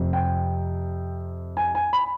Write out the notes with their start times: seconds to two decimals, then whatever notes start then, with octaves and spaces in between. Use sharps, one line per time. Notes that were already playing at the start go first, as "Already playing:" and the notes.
Already playing: F2 C3
0.13 G5
1.57 G#5
1.75 G#5
1.93 B5